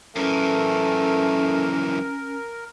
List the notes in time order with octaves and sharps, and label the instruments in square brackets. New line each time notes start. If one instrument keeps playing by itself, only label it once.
[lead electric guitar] F#2 E3 [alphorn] A3 [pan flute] C#4 [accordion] A#4